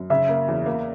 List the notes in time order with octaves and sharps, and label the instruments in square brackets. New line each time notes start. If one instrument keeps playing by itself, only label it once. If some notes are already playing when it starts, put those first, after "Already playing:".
Already playing: [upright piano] F#2
[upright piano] C#3 [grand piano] E5
[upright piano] A#3
E2
A#3